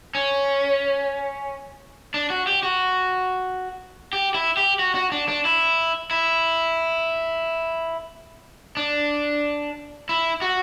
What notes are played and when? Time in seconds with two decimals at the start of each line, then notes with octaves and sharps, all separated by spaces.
0.15 C#4
2.14 D4
2.30 F#4
2.47 G4
2.63 F#4
4.13 G4
4.34 E4
4.57 G4
4.79 F#4
4.95 F#4
5.12 D4
5.29 D4
5.45 E4
6.11 E4
8.77 D4
10.09 E4
10.42 F#4